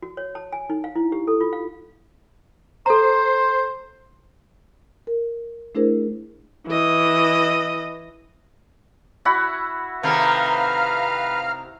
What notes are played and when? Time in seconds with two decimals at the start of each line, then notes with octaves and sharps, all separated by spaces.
0.03 F#4
0.17 C#5
0.35 A5
0.53 G#5
0.70 D#4
0.84 F5
0.95 E4
1.12 G4
1.27 A4
1.41 F4
1.53 F5
2.86 A4 C5 A#5
5.07 A#4
5.75 A3 D4 E4 G#4 A#4 C5
6.67 E3 D#5
9.25 E4 F#4 B5
10.03 C3 D#3 A3 B4 F5 A#5 F6